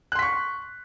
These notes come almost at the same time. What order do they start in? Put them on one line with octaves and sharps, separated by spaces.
F#6 C6 B6 C#6